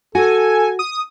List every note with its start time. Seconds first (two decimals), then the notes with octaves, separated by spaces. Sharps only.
0.15 F#4 A4 G#5
0.79 D#6